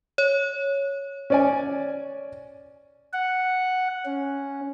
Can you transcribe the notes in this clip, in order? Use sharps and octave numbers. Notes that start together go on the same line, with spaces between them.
C#5
C#4 D5 G#5
F#5
C#4